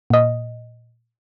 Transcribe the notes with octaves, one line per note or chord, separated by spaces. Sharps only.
A#2 D#5